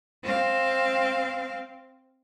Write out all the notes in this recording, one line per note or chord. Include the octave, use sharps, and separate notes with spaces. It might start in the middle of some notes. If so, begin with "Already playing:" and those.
C4 F5